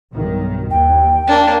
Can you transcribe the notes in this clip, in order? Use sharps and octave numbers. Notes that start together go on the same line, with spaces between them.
B1 G2 D#3
D#2 G5
A#3 D4